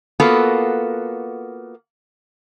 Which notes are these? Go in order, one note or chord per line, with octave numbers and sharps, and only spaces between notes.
A#3 B3 F4 F#4 A4